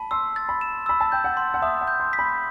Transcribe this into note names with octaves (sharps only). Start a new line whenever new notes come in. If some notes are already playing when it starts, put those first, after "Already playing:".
Already playing: A5 B5
C6 E6
A6
B5
E7
B5 E6
A5
G5 G6
F#5
C6
F#5
E5 D#6
F#5
G6
C6
B6
B5